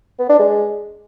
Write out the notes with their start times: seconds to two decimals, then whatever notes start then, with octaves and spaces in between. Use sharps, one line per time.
0.19 B3
0.29 D4
0.39 G#3